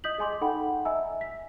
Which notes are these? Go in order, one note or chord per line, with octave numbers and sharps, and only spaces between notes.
D#5 D#6 G6 B6 F#7
G#4 D#5 G#5 C6 D6
D#4 A4 F#5 G5 B5
D#5 E5 G#5 A#5 E6
B6